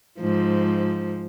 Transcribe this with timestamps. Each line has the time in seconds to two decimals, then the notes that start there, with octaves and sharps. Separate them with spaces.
0.20 G#2 F3